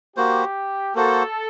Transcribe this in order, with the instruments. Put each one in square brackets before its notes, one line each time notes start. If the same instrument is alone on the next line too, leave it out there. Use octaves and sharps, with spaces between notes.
[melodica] A#3 F#4 C5 [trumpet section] G4
[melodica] A#3 F#4 C5 [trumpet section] A4